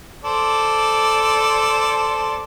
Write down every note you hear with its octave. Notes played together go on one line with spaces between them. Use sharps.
A4 C5 D5